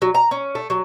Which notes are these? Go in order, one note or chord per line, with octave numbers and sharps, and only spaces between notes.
F#3
A#5
C#4
A3
F#3